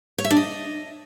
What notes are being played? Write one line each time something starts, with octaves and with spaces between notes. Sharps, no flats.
C#5
E5
D4
D#5